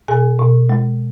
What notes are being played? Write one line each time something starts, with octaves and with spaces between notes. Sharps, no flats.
B2 G#4 G#5
B2
G#3